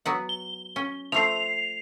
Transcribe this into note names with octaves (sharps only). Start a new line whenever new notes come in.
F#3 B3 F#5
G7
C#4
F3 A3 C4 C7 F7